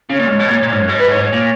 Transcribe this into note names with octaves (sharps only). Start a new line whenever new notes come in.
C#3 C#5
A#2
G#2
B2
A#2
A#2
G#2
F#2
G#2
B4
C#5
C#5
A#2